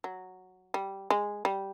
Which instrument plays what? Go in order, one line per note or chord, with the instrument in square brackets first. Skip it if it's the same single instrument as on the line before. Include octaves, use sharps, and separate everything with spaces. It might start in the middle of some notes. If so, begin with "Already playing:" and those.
[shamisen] F#3
G3
G#3
G3